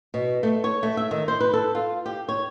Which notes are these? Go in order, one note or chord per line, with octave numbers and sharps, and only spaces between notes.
B2
A3
C#5
A3
E5
D#3
C5
B4
A4
F4
G4
C#5